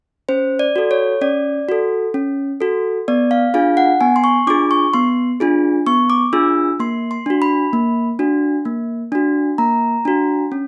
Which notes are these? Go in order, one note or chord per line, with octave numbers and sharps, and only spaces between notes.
C#4 C5
D5
F#4 A4
C#5
C#4 D5
F#4 A4
C#4
F#4 A4
B3 D5
F5
D4 F4 G#4 F5
F#5
B3 G#5
C6
C#6
D4 F4 G#4 D6
C#6
B3 C6
D4 F4 G#4
B3 C#6
D6
D4 F4 G#4 E6
A#3 C6
C6
D4 F#4
B5
A#3
D4 F#4
A#3
D4 F#4
A#3 A#5
D4 F#4
C#4